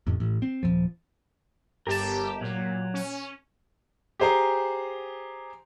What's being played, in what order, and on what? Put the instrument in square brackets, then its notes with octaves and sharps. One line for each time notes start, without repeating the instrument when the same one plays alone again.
[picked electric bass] A1 F2
A1
C4
D#1 E2 F3
[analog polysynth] G1 G4 [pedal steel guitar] A#4 A5
[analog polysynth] A#2 [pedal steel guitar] F#3
[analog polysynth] C#4
[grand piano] G4 G#4 C5 G#5 A#5